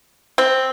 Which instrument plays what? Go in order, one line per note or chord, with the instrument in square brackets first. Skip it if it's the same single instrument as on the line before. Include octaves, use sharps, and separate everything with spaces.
[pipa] C4